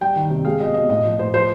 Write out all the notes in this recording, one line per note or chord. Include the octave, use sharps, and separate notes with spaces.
G3 G5
D#3
C3
G#3 F5
B2 D#5
B2 D#5
A2 D#5
F3
A2 C5
F3 C5